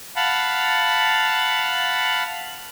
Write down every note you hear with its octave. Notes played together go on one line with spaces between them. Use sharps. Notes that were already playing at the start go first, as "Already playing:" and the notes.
F5 F#5 A5 B5